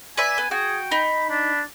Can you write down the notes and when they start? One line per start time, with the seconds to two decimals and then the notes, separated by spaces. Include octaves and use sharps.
0.17 B4 D5 E5 G#5
0.38 B3
0.51 F#4 G#4 G5
0.92 D#4 B5
1.30 D4 B5